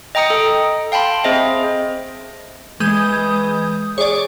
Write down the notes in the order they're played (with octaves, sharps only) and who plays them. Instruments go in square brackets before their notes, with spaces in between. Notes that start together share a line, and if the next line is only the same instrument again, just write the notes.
[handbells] D#5 G5 A#5 D#6 C#7
A4
F5 G5 A5 B5 C6
C4 G#4 C5 D#5 E5
[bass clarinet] E3 [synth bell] G#3 D#6 G6
[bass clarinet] G#4 [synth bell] C#5 D5